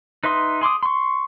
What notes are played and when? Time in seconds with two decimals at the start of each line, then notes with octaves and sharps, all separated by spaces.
0.24 D#4 B4 E5 C6 D#6
0.61 G#4 C6 D6 D#6
0.83 C6 C#6